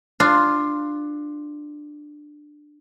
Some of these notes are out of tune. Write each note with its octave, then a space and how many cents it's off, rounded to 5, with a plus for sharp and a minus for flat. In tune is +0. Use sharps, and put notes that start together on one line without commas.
D4 +15 F4 +0